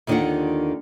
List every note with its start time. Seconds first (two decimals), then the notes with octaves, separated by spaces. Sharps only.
0.07 D#2 D3 D#3 D4 F4 F#5